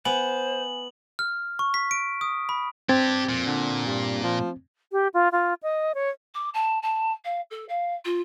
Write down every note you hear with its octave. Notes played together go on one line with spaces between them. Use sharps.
B3 C5 G#5 F#7
F6
C#6
B6
D7
D#6
B5
C4 D4 G4 G#6 A6
F2 A#2
D3
G2
F3
G4
F4
F4
D#5
C#5
D6
A5
A5
F5
A4
F5
F4